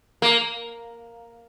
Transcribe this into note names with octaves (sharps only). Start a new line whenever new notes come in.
A#3